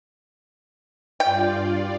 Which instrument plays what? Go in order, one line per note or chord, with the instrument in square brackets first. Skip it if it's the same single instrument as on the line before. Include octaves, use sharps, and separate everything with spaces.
[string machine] G2 F4 D5 [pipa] G5